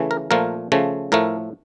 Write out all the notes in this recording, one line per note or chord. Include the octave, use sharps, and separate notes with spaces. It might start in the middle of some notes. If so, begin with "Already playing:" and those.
Already playing: C#3 E3 A3
A#4
A#2 F3 A3 A#4
C#3 F3 A3
A2 F3 A3 A#4